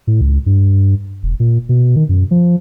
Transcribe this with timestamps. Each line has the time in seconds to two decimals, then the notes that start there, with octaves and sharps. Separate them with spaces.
0.07 A2
0.21 C#2
0.46 G2
1.23 E1
1.40 A#2
1.69 B2
1.96 D#3
2.09 F#2
2.31 F3